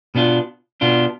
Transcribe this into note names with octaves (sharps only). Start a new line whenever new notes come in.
B2 B3 D4 F4
B2 B3 D4 F4